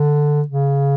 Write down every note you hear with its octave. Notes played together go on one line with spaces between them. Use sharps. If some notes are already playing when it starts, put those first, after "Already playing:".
Already playing: D3
C#3